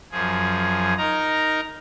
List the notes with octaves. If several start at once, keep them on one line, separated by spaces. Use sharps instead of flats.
F#2 F3 G#4
D#4 A#4 A#5